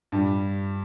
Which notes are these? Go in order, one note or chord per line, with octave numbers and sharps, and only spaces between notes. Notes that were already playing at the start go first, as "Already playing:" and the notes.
G2 G3